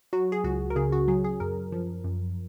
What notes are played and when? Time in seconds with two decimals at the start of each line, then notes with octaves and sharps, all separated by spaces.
0.13 F#3 F#4
0.32 G#4
0.44 C#2 F#4
0.70 A#4
0.76 C#3 G#4
0.92 F#4
1.08 F#3 G#4
1.24 G#4
1.40 F#2 A#4
1.72 F3
2.04 F#2